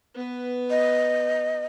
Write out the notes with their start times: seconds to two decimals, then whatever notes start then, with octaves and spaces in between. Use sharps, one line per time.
0.14 B3 B4
0.71 D#5